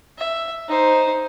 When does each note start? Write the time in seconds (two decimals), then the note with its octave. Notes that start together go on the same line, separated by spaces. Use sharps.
0.19 E5
0.68 D#4 C5